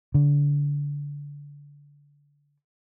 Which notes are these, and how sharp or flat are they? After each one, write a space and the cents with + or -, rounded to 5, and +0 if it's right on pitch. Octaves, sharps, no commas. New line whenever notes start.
D3 -25